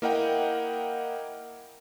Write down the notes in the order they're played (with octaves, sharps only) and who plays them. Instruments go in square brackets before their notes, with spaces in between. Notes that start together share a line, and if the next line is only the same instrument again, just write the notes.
[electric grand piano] A#3 E4 A#4 D#5 F#5 G5